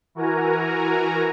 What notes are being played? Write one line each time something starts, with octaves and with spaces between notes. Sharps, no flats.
E3 F#4 A#4 G#5 A#5